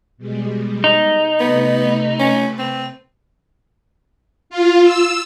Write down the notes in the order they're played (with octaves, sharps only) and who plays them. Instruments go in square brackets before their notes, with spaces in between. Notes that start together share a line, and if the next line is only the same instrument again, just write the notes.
[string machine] B2 G3 G#3
[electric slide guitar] D#4
[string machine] C3 A3 B4 [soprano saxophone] B3
[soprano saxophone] C#4
C4
[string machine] F4
E6